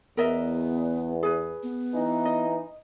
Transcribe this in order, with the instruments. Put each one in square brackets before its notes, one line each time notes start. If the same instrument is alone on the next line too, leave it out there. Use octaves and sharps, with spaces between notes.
[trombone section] E2 [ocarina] B3 [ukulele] A#4 D#5 E5
[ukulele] G#4 B4
[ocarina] B3
[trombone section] E3 D#4
[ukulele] D#5